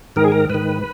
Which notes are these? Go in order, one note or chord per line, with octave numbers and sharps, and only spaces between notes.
G#2 D#3 A#4
G#4
A#4
G#2 D#3 B4